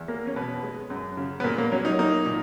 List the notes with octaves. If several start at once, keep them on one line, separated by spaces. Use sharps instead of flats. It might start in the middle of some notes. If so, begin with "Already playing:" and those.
Already playing: E2
A#3
C#4
B2 B3
G#3
F#2
C#3
B3
A#2 A#3
A#3
F#3 C#4
D#4
A#3 D#4
A#2